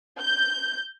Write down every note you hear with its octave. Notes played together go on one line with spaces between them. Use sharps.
G6